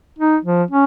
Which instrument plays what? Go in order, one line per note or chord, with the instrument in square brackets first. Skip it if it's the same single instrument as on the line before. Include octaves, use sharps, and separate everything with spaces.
[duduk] D#4
F3
C#4